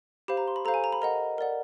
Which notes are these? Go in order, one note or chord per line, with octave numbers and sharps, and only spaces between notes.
G4 C5 F5 B5
A#5
C6
B5
A4 C5 F5 A#5
G#5
A#5
B5
A#4 D#5 F#5 A#5
A#4 D5 F#5